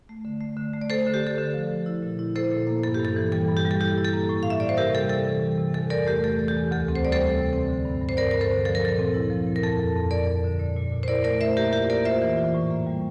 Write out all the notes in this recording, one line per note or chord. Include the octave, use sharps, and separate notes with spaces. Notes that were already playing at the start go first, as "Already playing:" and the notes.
A3
D3
A3
D3
A3
D5
A3 A4 C5
D3
G4
D3 A4
D3
F3
F3
E4
A#2
E4
E4 A4 C5
A#2
A#3
G2 A4
G2 G4
A4
E3
G3 A4
G2
G4
G3
A4
E4 G4
E4
A4
A#3
A2
A2 F5
E5
A2 D5
C5
C3 G4 A#4
G3 A4
C3 A4
E3
G3
C3
E2 A4
E2 A#4 D5
A3 G4 A#4
A3 A4
E3
G4
E2
D2 A4
C4
C5
G3 D5
A4 C5
G3
C3
C4
D3
G2
G2
C5
G2 A#4 D5
G2 A#4
A4 C5
D3
F3 A4
A#4
A#2 A4
C4
E4
F3
A#2
A#4
F2 A4
F2
F2
F2 A#4 D5
F2
D3
A#2
A#2
A#2
C5
E4 A#4 D5
A3 A#4 D5
A3 C5 E5
A#3 G4 A#4
F4 G4 A#4
A#3 A#4 D5
F4 C5 E5
E3
F4
A2
A#3
G3